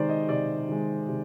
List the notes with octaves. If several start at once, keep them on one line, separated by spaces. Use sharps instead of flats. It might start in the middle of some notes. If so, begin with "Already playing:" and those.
Already playing: C3 D#3 G#3 C5 D5
D#5
C3 D5
D#3 G#3
C3